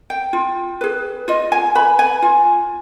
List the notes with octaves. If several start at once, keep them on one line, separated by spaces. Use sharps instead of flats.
G5
F4
G#4 B4
F4 D#5
G#5
B4 B5
G#5
F4